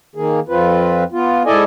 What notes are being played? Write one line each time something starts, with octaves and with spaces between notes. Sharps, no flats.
D#3 A#3 G#4
F2 C4 F4 B4
B3 F4
G#2 E4 A4 D5 D#5 G#5